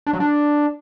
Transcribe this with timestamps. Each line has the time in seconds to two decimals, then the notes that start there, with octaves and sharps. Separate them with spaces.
0.07 D4
0.13 F#3
0.20 D4